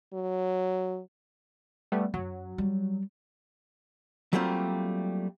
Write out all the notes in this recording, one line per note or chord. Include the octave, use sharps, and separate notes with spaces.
F#3
G3 A3 B3
F#2 F#3
G3
F#3 G3 A3 A#3 C4 F4